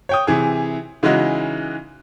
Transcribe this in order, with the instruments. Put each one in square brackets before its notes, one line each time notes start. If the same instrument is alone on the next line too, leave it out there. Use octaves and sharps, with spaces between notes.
[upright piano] C#5 G5 D#6
C3 E3 G#4
C#3 E3 G#3 D#4 F#4